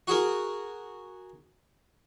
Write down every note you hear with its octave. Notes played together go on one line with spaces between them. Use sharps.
F#4 G#4 A#4